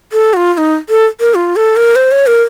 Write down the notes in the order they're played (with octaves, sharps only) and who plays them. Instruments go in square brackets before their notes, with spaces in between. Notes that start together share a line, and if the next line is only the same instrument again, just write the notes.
[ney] A4
F#4
F4
F4
D#4
A4
A#4
F4
A4
A#4
C5
C#5
A#4